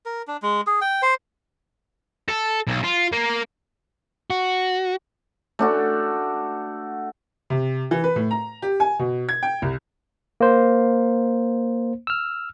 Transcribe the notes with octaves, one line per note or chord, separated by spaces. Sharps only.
A#4
D4
G#3
G#4
G5
C5
A4
B1
F4
A#3 A#4
F#4
A3 D4 F#4
C3
E3
B4
A2
A#5
G4
G#5
B2
G#6
G5
C2
A#3 C5
E6 F6